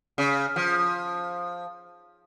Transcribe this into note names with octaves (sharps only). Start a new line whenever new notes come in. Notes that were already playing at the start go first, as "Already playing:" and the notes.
C#3
F3